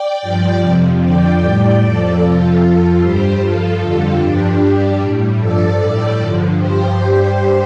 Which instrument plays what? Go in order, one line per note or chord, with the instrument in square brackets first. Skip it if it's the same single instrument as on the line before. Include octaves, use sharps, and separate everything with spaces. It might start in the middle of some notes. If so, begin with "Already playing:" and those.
Already playing: [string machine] D5 G5
G2 F3
F2 C3 F3
F2 D3 F3 D5 G5
A2 G3
F2 F3 A4 D5
F2 C3 F3 F4 A4
F2 F3
G2 G3 G4 C5
G2 F3 F4 A4
F2 D3 G3 F4 A4
G2 F3 D4 G4
G2 G3 D4 G4
A2 G3
G2 F3 A4 D5
A2 G3
G2 D3 F3
G2 F3 G4 C5
G2 G3